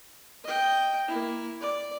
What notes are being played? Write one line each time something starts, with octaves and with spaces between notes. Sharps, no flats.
D#5 G5
A#3 E4
D5